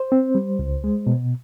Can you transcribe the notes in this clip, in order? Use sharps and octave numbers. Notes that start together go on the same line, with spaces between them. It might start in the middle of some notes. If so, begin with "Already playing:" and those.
Already playing: C5
C4
G3
C#2
G#3
B2